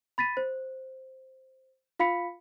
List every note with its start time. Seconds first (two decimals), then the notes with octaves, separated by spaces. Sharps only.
0.18 B5 A6 B6 D#7
0.37 C5
1.99 F4 F5 B5 B6 C#7